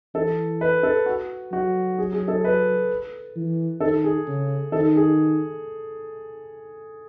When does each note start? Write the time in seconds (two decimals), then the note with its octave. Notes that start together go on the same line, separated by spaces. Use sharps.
0.15 E3 A4
0.61 B4
0.83 A4
1.06 F#4
1.52 F#3 F#4
1.98 G#4
2.13 G#4
2.28 A4
2.44 B4
3.36 E3
3.81 D#3 A4
4.04 G#4
4.27 C#3
4.72 D#3 A4
4.96 G#4